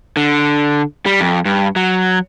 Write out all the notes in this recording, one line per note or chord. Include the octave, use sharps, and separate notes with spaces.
D3
G3
F2
G2
F#3